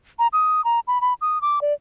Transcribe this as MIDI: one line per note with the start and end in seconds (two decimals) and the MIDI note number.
0.19 0.27 82
0.33 0.64 87
0.65 0.80 82
0.87 1.01 83
1.01 1.14 83
1.21 1.41 87
1.42 1.59 86
1.61 1.73 74